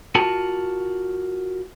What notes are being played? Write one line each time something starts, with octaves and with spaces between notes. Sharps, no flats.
F4 F#4 A#4 A5